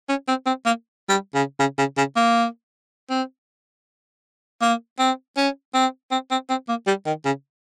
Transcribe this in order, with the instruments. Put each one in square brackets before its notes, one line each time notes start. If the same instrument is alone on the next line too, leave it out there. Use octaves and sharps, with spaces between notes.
[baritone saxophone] C#4
C4
C4
A#3
G3
C#3
C#3
C#3
C#3
A#3
C4
A#3
C4
C#4
C4
C4
C4
C4
A#3
G3
D#3
C#3